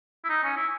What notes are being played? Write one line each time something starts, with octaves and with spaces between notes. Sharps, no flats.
E4
D#4
C#4
E4